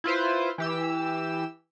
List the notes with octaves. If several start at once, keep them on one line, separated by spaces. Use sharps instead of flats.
E4 F4 B4 C5
E3 G4 E6